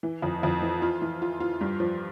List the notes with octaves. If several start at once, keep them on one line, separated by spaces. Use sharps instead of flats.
E3
F2
F2
E3
F4
E3
F4
F4
G2
F3